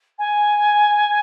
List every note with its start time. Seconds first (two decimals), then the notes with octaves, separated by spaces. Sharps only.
0.18 G#5